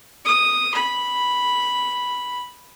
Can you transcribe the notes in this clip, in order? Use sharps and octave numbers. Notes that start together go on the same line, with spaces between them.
D#6
B5